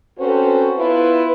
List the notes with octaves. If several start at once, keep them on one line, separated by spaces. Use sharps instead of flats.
C4 C#4 F#4 A4 B4 C5
B3 E4 F4 B4